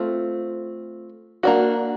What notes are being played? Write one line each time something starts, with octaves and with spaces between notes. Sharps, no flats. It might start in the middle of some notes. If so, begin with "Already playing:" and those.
Already playing: A3 C4 F4
A#3 D4 F#4